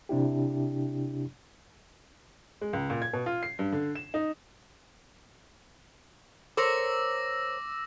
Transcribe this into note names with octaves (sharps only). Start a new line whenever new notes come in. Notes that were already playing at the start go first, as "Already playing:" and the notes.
C3 D4 E4 G4
G#3
C#2
A#2
G#6
B2
F4
C7
G2
D3
E7
D#4
A#4 C5 C#5 D6 E6 A#6